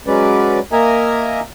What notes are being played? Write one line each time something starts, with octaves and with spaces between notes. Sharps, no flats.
F#3 G#3 C#4 B4 D5
A#3 A#4 D#5 E5 G#5 A#5